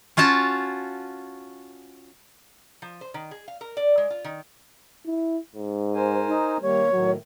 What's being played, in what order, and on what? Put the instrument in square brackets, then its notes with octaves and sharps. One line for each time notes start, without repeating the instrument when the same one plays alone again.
[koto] C#4 F4 F#4 A5
[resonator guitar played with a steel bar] F3
C5
D#3
G#4
F5
A#4
D5
G#3
F4
D#3
[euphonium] E4
G#2
[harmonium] A#4 C5 G#5
[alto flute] D#4
[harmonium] D#3 A#3 [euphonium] G3 [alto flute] C#5
[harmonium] A2 D#3 [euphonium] F#3